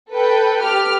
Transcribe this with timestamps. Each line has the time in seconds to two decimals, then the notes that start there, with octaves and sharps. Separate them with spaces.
0.11 A4 B4 G5
0.60 G4 F6